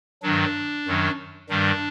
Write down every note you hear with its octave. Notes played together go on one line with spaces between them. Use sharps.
G2 D#3 F#3 D4
F#2 D#3 F#3
G2 D#3 G3 D4